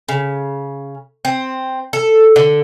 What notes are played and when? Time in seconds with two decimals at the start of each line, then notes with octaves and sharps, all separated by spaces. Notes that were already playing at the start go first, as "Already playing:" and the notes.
0.09 C#3
1.25 C4
1.93 A4
2.36 D3